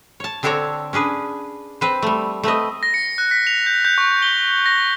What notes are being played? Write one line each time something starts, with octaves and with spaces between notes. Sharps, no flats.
C#5 A5
D3 C4 D4 A4 C#5 A#5
C#4 D4 G#4 B4
C4 B4 C5
G3 A3
A3 C4 B4 D#5
A#6
C#7
F#6
B6
F7
G6
G6
C#6
G7
A#6